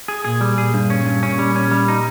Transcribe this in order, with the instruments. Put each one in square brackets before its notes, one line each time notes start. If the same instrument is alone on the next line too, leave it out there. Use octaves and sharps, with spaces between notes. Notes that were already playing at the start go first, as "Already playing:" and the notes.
[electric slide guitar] G#4
[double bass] A#2 [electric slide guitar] G#4
[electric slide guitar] G3
[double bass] A#2 [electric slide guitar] G#4
[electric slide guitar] G2
C#4
G2
[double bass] A#2 [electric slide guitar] C#4
[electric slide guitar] G3
C#4
G3
D#4